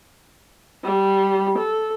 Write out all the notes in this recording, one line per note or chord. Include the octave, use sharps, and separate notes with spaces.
G3
A4